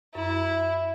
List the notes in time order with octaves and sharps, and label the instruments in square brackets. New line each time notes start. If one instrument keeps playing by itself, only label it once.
[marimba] F#2 [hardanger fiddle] E4